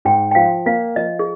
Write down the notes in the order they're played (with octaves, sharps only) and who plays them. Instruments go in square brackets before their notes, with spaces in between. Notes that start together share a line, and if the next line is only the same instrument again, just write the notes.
[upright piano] G#2 [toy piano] G5
[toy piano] G5
[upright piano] F3 [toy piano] F5
[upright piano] A#3 [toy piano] F5
[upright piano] F3 [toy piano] D#5
[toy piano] G#4